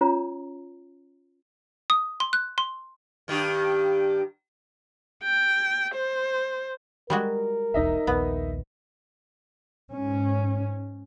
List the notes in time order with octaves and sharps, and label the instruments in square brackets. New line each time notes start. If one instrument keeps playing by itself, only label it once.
[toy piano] C#4 F4 C#5 A#5
[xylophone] D#6
C6
F#6
C6
[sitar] G2 D#3 G4
[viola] G5
C5
[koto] G3 G#3 F#4 [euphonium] A#4
[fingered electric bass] D#1 B1 E2 [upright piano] D#4 D#5 E5
[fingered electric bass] A#1 D#2 [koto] B3
[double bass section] G#2 C#4